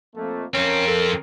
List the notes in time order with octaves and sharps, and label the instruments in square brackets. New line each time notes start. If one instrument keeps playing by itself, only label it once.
[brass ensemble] F2 A3 A#3
[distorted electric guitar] F2 C4 [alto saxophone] C#4 [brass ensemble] A#4
[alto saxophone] A4